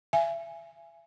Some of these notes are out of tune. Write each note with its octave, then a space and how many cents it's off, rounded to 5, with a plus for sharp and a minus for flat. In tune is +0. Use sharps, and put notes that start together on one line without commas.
E5 +35 G#5 +0